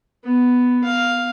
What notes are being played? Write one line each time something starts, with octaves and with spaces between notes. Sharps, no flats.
B3
F5